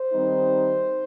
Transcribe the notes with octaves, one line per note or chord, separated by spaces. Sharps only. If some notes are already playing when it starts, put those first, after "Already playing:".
Already playing: C5
D#3 G3 C4 D#4